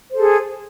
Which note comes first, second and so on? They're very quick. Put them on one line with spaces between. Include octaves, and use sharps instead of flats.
C5 A4 G#4